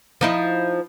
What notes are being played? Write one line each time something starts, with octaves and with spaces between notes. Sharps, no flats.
F3 D#4 E4